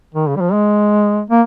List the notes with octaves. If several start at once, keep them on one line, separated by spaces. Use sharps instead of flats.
D#3
C#3
G3
F3
G#3
A#3